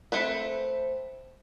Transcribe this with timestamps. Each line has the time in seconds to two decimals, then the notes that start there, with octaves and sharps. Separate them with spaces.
0.12 A3 C4 B4